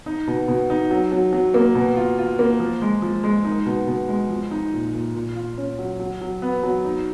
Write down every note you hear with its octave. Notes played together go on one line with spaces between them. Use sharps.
D#4
B2
B2
D#4
F#3
F#3
F#3
A#3
B2
F4
F4
A#3
F3
G#3
F3
G#3
D#4
B2
B2
G#3
F3
D#4
A#2
A#2
A#2
F4
C#4
F#3
F#3
F#3
B3
F#3
D#4